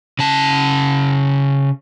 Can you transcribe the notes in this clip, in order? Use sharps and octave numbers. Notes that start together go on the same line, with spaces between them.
C#3 A5